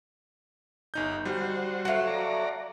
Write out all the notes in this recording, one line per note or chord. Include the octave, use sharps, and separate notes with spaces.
G1 D#4 G6
G3 F#4 C5
F#3 A3 F5 F#5
D5 A#5